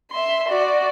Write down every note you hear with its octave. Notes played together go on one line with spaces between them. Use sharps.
E5 C6
F#4 D5